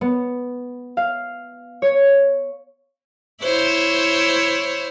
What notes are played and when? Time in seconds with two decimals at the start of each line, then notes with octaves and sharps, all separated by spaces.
0.01 B3
0.97 F5
1.82 C#5
3.42 E4 C5 C#5